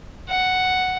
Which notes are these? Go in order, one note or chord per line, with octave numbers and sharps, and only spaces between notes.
F#5